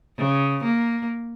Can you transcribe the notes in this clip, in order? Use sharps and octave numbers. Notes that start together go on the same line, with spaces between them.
C#3
A#3